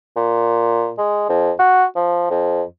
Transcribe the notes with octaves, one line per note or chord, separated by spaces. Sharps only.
A#2
G#3
F2
F#4
F3
F2